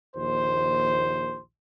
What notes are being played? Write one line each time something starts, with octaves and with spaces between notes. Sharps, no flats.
A#1 D#2 C5